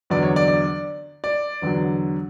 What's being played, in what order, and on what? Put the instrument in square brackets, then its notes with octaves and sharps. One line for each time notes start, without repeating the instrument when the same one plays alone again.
[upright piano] E2 D3 F#3 D5
C#5
D5
D5
D5
E2 D3 F#3